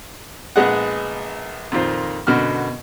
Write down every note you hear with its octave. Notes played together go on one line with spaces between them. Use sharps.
A#1 G#3 B3 G#4 D#5 F#5
F2 A#2 D#3 F4 C5
F#2 B2 D3 F#4 F6